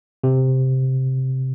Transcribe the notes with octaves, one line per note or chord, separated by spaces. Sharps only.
C3